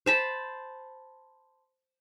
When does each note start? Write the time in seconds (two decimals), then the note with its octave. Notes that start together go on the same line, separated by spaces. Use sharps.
0.06 C5 A5 B5